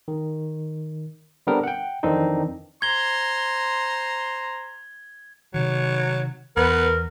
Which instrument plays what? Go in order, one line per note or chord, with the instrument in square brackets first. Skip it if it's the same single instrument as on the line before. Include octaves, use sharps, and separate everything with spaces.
[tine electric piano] D#3
D3 G3 B3 C4 D4 A#4
F#5 G5
F2 D#3 E3 C4 D4 D#4
[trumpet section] C5 A#5 C6 [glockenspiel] G#6 G7
[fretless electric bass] C3 D#3 [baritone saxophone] F#3
[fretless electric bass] E2 [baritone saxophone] B3 [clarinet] A#4 [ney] B4